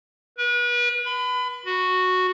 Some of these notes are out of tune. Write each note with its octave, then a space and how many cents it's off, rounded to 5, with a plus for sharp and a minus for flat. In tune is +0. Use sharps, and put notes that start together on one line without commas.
B4 -35
B5 +30
F#4 -5